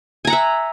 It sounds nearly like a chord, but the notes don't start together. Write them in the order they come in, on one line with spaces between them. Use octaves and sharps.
G#5 A#5 F#5 E5